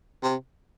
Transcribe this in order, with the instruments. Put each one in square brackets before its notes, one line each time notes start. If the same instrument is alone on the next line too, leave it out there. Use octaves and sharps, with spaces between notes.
[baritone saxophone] C3